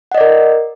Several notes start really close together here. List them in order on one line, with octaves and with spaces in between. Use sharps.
F#5 D#5 D5 A#4